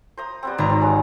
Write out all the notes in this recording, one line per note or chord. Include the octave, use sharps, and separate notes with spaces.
C5 A#5 D#6
G3 B3 C4
G#1 B3 D5 A#5
C4
G#3 C#4